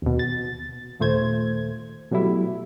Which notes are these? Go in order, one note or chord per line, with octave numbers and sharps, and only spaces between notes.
D#2 B2
A6
D#2 A#2 A3 C5 G#6
B2 F#3 G3 A3 E4